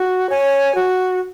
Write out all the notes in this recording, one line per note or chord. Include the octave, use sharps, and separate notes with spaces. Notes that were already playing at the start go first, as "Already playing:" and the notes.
Already playing: F#4
C#5 G#5
F#4